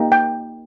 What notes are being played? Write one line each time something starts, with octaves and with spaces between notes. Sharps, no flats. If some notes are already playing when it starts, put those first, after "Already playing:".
Already playing: A#3 D#4 G4
G5